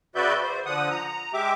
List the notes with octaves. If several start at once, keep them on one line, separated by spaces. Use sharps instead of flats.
C#3 F#4 B4 D5 E5 G6
C5
D3 F3 F#5 D#6
A#5
G#3 G4 E5 D6